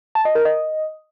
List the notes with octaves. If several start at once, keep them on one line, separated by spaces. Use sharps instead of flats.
A5
D#5
A#4
D#5